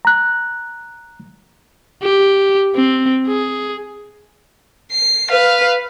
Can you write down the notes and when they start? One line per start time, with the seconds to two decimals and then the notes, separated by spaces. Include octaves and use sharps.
0.05 A#5 F#6
2.03 G4
2.75 C4
3.27 G#4
4.92 C7
5.30 B4 F5